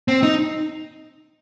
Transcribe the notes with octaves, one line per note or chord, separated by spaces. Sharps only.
C4
D#4